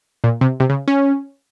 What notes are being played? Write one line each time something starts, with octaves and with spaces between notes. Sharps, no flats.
A#2
C3
C3
C#3
C#4